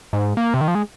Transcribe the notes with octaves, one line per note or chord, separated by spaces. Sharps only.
G#2
A#3
C3
D#3
F3
G#3